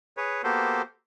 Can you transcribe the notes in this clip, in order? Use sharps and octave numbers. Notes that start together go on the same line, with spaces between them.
G#4 B4 C#5
A#3 B3 F#4 G4 A4 C5